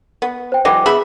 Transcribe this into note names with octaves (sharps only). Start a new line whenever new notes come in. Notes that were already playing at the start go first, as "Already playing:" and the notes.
B3
C5 G5
E3 F#3 G#3 G5 D6
B3 G#4 E5 B5